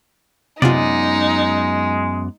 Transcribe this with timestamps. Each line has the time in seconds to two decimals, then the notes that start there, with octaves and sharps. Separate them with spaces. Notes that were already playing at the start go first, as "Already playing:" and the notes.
0.62 F#2 C3 G#3 B3 D#4 F4 D5